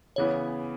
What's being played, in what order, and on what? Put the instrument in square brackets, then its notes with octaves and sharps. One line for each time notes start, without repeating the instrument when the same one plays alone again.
[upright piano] C#3 E3 B3 [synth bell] C#5